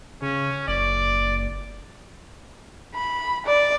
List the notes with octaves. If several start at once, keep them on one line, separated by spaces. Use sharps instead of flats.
C#3 C#4
F#1 D5
B5
D5